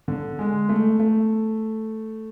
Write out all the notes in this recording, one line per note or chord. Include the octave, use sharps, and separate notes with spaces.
D3
G#3
A3
A3